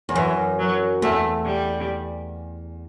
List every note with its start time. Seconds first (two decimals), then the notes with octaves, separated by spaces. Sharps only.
0.09 E2
0.15 F#2 E3
0.59 F#3
1.02 E2 A3
1.45 G3